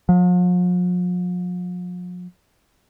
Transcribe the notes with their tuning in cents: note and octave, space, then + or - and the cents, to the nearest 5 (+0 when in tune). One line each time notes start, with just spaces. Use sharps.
F3 +45